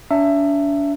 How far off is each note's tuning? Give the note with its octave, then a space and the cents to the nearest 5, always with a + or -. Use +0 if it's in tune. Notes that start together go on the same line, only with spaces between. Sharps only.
D4 -35 E5 +15 A#5 -45